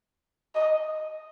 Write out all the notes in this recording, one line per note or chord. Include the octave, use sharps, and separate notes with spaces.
D#5